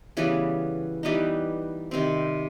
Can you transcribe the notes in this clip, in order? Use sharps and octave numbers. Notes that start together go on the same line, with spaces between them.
C#3 E3 G3 B3
E3 G3 B3 D#4
C3 D#3 G3 C4